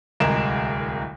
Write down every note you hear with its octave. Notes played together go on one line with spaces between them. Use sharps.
D1 C2 G#3 G#4 A#4 E7